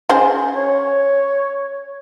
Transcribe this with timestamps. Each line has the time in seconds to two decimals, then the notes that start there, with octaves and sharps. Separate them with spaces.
0.09 C#4 G#4 C5
0.56 C#5